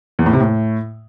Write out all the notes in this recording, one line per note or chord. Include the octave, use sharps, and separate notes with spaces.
E2
A2
C3
A2